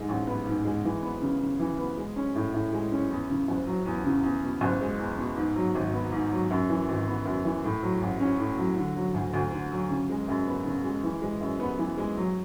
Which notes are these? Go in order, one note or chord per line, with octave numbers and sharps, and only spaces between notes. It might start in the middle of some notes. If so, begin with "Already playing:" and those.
Already playing: G#2 G#3
A1
B3
G#2
G#3
E3
B3
C#3
C#3
E3
B3
G#3
C#4
A2
A2
G#3
C#4
E2
C#3
F#1
F#3
E2
C#3
E2
B2
F#1
G#3
E2
B2
G#2
F#3
G#1
B3
G#2
F#3
F#2
E3
G#1
B3
F#2
E3
A2
F#3
A1
C#4
A2
F#3
D3
F#3
D2
D2
D3
F#3
C#3
G#3
F#2
B3
C#3
G#3
E3
G#3
F#2
B3
E3
G#3
F#3